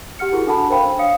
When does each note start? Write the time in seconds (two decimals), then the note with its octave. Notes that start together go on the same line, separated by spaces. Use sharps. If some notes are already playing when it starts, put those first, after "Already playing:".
0.19 G4 F#5 F6 C#7
0.33 E4 F#4 G#4 A#4
0.47 D4 F#4 A4 F#5 A5 B5
0.70 A#4 C5 F5 G5 B5
0.86 D4
0.99 C#5 F5 D#6 C#7